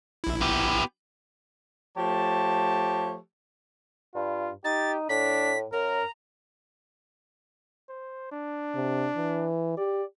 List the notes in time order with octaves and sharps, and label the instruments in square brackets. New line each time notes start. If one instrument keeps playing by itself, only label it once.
[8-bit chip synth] A#1 E4
[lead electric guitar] B3 G4
[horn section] F3 A3 G4 C#5 A5
[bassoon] G2 [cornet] F4
[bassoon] D#4 [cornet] G4 [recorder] A6
[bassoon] A2 [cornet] D4 [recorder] B6
[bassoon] F#2 [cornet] A#4 [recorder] A#5
[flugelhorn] C5
D4
[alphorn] C3
E3
[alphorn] G4 [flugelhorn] D5